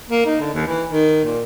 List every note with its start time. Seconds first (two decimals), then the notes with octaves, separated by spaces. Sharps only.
0.10 A#3
0.25 D#4
0.40 D3
0.53 D#2
0.66 E3
0.90 D#3
1.24 A#2